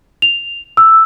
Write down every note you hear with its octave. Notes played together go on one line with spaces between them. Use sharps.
F7
E6